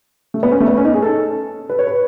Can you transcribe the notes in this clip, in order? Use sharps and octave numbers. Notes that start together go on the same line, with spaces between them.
A3
B3
C#4
A3
B3
C#4
D#4
G#4
A4
B4
C#5
B4